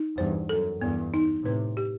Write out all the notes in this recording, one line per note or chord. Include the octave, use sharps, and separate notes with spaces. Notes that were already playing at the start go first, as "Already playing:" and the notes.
Already playing: D#4
E2 G2 C5
F#2 A4
E2 G2 B3
D#4
A2 C3 B4
G4